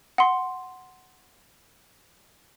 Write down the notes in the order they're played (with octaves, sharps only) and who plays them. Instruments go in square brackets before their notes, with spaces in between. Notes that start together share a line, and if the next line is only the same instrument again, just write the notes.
[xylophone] F#5 C6